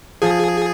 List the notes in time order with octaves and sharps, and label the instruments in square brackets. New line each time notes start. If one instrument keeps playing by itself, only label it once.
[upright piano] F3 [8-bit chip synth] G#4